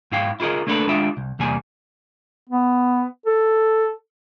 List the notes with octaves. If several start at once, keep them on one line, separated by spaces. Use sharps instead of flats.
G#2 E4 F5 G5
E4 F4 G#4 A#4 D#5
A3 A#3 D4 E4 A4 B4
G#3 D4 F4 G4 E5
C2
E2 C3 G3 A#3 G#5
B3
A4